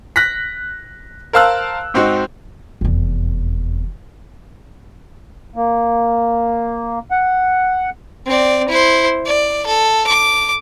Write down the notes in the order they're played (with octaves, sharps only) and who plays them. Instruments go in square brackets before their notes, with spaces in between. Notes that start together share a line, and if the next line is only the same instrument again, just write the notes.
[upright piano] F#6 A#6 B6
A#4 C5 F5 A5 E6 F#6
G#2 C4 D#4 F#4
[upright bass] F1 E2
[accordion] A#3
F#5
[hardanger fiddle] C4 D5
E4 C5
D5
A4
D6